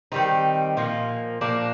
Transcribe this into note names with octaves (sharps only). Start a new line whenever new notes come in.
D#3 G3 C4 D#4
A#2 F3 A#3
A#2 F3 A#3 D4